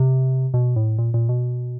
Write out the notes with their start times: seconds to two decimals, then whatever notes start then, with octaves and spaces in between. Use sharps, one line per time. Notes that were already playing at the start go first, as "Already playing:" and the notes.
Already playing: C3
0.54 B2
0.76 A2
0.98 A#2
1.14 A#2
1.29 B2